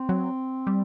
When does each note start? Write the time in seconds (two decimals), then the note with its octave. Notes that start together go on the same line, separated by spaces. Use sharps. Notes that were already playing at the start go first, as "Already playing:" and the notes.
Already playing: C4
0.09 F#3
0.67 G3